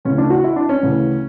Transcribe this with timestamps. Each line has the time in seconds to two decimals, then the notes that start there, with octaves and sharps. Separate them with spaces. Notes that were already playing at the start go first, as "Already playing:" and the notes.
0.05 D2 C#3 E3 C#4
0.18 D4
0.30 F#4
0.44 E4
0.56 D4
0.69 C#4
0.83 D2 C#3 E3